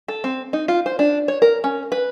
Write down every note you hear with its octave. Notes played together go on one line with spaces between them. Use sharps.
A4
C4
D#4
F4
C5
D4
C#5
A#4
C#4
B4